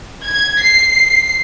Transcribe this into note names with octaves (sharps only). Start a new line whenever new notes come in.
G#6
C7